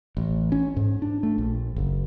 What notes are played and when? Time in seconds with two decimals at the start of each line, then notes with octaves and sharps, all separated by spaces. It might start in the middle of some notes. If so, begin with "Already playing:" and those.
0.17 A1
0.52 C#4
0.76 G#2
1.02 D4
1.23 A3
1.38 A#1
1.76 F#1